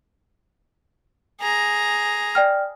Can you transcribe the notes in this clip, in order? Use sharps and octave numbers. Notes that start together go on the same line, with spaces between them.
G#4 A#5
D5 G5 F6